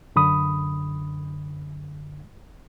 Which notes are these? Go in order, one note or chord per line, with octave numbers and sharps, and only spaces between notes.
F#2 D3 B5 D#6